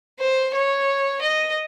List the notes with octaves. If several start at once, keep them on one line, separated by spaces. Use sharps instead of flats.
C5
C#5
D#5